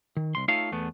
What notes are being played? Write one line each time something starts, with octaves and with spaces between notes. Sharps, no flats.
D#3
C2 C6
A3 D#4 F4 A4 C#5 F5
E2 A3 B3